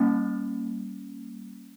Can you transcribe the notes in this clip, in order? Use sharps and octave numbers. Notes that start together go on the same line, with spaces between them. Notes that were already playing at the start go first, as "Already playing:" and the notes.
Already playing: G3 A#3 C#4